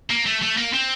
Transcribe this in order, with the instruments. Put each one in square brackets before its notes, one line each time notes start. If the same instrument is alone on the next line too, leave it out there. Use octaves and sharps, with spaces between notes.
[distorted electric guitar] A#3
A3
A3
A#3
C4